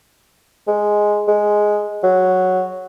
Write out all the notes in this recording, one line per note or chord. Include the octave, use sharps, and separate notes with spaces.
G#3
G#3
F#3